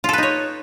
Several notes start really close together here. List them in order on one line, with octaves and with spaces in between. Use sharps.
F4 A4 B4 D#4 C#5